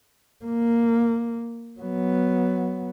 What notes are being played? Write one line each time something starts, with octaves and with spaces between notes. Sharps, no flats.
A#3
F#3 B3